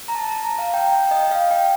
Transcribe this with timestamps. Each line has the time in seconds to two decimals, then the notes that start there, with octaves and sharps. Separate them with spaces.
0.08 A#5
0.15 A5
0.29 A#5
0.45 A#5
0.58 F5
0.74 G5
0.92 G5
1.11 D#5
1.31 F5
1.51 G5